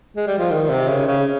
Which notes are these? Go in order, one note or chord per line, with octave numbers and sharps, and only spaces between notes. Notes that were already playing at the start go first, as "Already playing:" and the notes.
G#3
G3
F3
D#3
C3
C#3
C#3